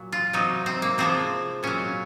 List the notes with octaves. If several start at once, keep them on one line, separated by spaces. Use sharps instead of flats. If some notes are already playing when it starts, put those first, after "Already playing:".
Already playing: A#2 F#3
F4
C3 F#3 D#4
C4
A#3
C3 F3 G#3 C4
A#2 F#3 C#4